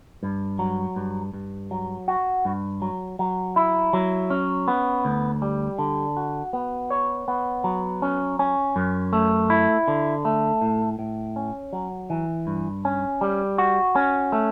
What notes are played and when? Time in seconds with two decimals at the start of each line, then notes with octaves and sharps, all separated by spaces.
0.23 G2
0.59 F#3
0.96 G2
1.33 G2
1.71 F#3
2.08 F#4
2.45 G2
2.82 F#3
3.19 F#3
3.56 E4
3.93 F#3
4.30 C#4
4.68 B3
5.05 D2
5.42 G3
5.79 D3
6.17 F#4
6.53 B3
6.91 C#5
7.28 B3
7.64 F#3
8.02 C#4
8.39 C#4
8.76 F#2
9.13 A3
9.50 E4
9.88 D3
10.25 A3
10.62 A2
10.99 A2
11.36 C#4
11.73 F#3
12.10 E3
12.47 G2
12.85 C#4
13.21 G3
13.58 F#4
13.96 C#4
14.32 A3